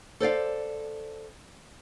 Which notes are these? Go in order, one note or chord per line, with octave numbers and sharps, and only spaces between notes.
A4 C5 D5 F5